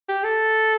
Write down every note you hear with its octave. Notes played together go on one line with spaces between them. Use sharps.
G4
A4